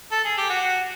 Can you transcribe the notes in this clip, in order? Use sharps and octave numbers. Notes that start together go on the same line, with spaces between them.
A4
G#4
G4
F#4